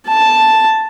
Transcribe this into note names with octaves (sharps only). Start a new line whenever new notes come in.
A5